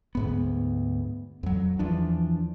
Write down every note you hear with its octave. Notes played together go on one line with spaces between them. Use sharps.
D2 G#2 B3
F2 F#3
E2 E3 F3 D4